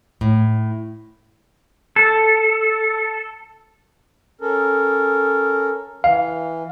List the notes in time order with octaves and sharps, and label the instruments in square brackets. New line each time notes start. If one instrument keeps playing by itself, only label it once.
[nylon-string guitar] A2
[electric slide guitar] A4
[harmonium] C#4 A4 A#4
[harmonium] E3 [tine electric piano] F5